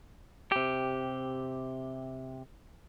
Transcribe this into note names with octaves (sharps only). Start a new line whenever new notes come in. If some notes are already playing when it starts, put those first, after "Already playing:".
C3 G4